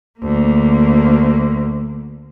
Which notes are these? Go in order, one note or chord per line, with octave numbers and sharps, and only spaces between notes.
D2 A#3